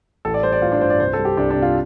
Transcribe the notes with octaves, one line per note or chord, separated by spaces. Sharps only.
A1 A4
D5
G3 C5
D5
A1 F4
D4
G2 C5
D5
C2 C5
A4
G3
G4
C2 D4
D4
C3
F4